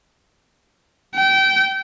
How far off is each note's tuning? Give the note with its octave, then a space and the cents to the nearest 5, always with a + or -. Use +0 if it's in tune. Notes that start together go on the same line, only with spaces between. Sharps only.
G5 -25